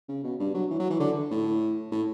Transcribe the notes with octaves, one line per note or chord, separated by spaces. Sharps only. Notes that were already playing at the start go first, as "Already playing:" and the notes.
C#3
B2
G2
F#3
E3
F#3
E3
D3
A2
A2